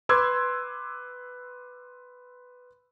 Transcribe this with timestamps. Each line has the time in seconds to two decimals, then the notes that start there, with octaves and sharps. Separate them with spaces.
0.09 B4 C6 D6 E6 G#6